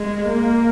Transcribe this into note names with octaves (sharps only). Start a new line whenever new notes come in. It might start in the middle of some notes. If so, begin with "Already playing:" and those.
Already playing: G#3
A#3